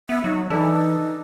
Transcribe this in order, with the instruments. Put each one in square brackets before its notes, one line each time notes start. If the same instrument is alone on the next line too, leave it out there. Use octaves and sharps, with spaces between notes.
[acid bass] B3 [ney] E5
[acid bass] F#3 [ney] D#4
[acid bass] E3 [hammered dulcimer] D4 A4 [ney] D#4